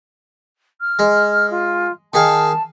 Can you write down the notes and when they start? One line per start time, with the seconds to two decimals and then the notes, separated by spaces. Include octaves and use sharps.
0.81 F6
0.99 G#3
1.50 F4
2.14 D#3 G#4 F5 A5